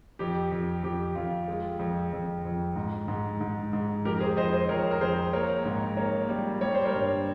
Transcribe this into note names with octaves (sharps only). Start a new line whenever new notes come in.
F2 G4
F2
F2 G4
F2 F4
G#3
F2
F2
F2
G#2
G#2
G#2
G#2
F2 G4 A#4
G#4 C5
F2 C5 D#5
C5 D#5
F2 A#4 C#5
A#4
F2 G#4 C5
A#3 A#4 C#5
G#2
A#3 A#4 C#5
G3
G3 C#5
C5
A#4 C#5
G2